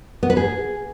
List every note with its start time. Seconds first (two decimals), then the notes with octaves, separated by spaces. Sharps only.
0.23 B3
0.30 B4
0.37 G#4